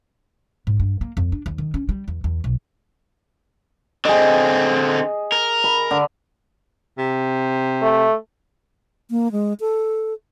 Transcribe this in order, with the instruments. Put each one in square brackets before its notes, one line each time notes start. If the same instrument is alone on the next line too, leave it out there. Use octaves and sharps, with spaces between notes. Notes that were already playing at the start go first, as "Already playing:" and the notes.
[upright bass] G#2
G2
A#3
F2
D4
D#2
D#3
C#4
G3
E2
E2
B1
[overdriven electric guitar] D3 C4 [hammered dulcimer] G#4 D#5
[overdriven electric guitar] A#4
[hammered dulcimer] B5
D3
[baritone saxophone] C3
[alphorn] A3
[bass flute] A#3
G#3
A4